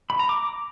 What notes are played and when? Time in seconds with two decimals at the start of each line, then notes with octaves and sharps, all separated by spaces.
0.10 B5
0.19 A#5
0.29 D6